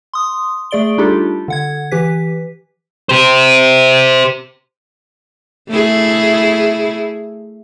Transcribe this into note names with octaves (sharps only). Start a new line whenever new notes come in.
C6 D#6
A3 G#4 D5 D7 G7
G3 D4 D#4 F4 G4 A4
D3 F#5 G#6
E3 G4 B4 B6
G4 C5
A3 E4 G#4